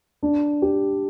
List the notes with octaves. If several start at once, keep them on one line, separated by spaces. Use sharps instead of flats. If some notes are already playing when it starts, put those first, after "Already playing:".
D4
G4